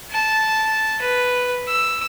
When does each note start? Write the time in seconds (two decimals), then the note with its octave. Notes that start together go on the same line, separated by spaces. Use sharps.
0.11 A5
1.01 B4
1.68 E6